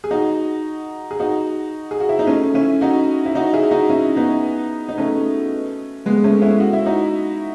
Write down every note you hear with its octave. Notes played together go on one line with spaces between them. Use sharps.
G#4
D#4 F#4
G#4
D#4 F#4
G#4
F#4
E4
D#4
A3 C#4
C#4 E4
D#4 F#4
E4
D#4 F#4
E4 G#4
D#4 F#4
C#4 E4
B3 D#4
D#4
A3 C#4
G#3 B3
A3 C#4
C#4 E4
F#4
E4
D#4 F#4